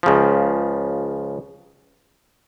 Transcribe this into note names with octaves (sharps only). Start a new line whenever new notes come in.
C#2 C#3 F3